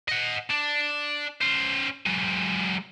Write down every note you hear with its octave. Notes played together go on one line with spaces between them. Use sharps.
D#5 F#5
D4
C#4 C5
F#3 G#3